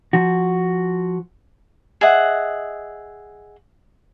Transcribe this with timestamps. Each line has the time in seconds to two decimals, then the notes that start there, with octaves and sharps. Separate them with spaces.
0.13 F3 F#4
2.01 G#4 D#5 E5 F#5